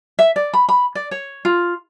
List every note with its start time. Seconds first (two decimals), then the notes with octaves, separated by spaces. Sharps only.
0.19 E5
0.36 D5
0.54 B5
0.69 B5
0.95 D5
1.11 C#5
1.45 F4